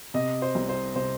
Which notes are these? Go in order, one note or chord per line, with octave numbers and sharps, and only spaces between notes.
C3 D#5
C5
C2
C5
C3 C5